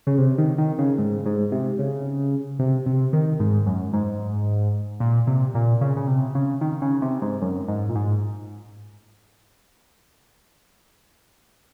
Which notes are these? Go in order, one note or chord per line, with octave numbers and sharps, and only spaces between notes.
C#3
C3
D#3
D#3
C#3
G#2
G#2
C3
C#3
C3
C3
D#3
G#2
F#2
G#2
A#2
C3
A#2
C#3
C#3
C3
C#3
D#3
C#3
C3
G#2
F#2
G#2
A#2
G#2